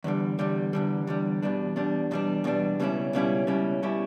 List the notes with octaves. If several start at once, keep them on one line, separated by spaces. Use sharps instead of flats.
E2 D3 G3
E2 D3 G3
E2 D3 G3
E2 D3 G3
E2 B2 G3 D4
E2 B2 G3 D4
E2 B2 G3 D4
E2 B2 G3 D4
C#2 B2 G3 C#4 E4
C#2 B2 G3 C#4 E4
C#2 B2 G3 C#4 E4
B2 G3 C#4 E4